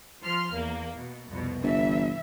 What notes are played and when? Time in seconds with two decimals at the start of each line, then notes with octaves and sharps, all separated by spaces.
0.22 F3 C6 F6
0.52 E2 A#3
0.97 B2
1.28 C2 F2 B2
1.63 G1 E3 E5